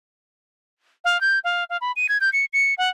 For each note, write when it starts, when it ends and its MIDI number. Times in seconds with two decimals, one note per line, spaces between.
1.05 1.20 77
1.21 1.39 91
1.44 1.64 77
1.70 1.77 77
1.81 1.92 83
1.96 2.07 99
2.09 2.18 92
2.21 2.30 91
2.33 2.45 97
2.53 2.74 97
2.78 2.89 78